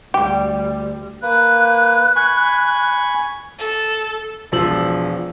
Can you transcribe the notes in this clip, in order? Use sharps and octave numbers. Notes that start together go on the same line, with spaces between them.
D2 G3 G4
A#3 B4 F#6
G#5 B5 C#6
A4
E1 F3 E6 F#7